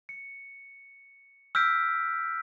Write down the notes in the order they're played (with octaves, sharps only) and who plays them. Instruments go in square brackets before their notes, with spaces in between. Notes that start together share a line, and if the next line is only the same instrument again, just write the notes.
[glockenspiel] C#7
E6 F6 G6 B6 D7